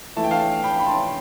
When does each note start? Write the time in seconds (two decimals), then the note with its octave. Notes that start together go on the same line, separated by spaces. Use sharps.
0.17 E3 A3 E4 A5
0.24 G5
0.31 F5 A5
0.63 G5 B5
0.80 B5
0.86 A5 C6